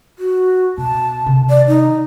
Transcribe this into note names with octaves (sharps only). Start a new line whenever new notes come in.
F#4
B2 A5
C3 D#3
D5
D#4